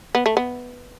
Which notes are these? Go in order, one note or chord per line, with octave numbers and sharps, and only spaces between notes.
B3
A3
B3